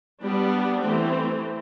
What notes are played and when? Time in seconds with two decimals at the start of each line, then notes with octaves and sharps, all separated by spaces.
0.22 G3 B3 D4
0.81 E3 A3 C4